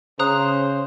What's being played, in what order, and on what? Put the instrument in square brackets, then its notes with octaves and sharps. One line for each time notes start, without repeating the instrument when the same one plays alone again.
[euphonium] C#3 [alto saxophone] C5 [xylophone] A#5 D#6 F#6